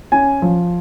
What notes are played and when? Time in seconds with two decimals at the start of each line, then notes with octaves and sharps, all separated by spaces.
0.12 C#4 G#5
0.42 F3